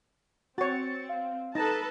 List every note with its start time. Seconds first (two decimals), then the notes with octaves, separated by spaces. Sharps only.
0.58 C4 F#4 C#5 A6 C#7
1.09 F5
1.55 D#4 A4 B4 A5 A#6